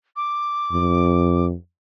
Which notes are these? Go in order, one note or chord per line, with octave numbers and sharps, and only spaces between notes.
D6
F2